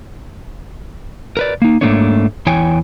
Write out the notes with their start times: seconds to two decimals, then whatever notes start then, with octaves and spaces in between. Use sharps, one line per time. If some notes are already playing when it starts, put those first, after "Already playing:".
1.37 A#4 B4 D5
1.62 A#3 D#4
1.81 G#2 E3 A3 A#3 D4 C#5
2.47 E2 E3 C#5 G5 G#5